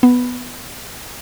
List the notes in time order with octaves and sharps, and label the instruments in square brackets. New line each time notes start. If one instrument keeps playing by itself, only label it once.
[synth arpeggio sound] B3